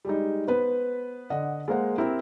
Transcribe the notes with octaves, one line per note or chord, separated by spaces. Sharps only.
G3 G#3 D#4
B3 B4 C5
D3 D#5 F#5
G#3 A#3 C5 F#5
C4 E4 G4 A#4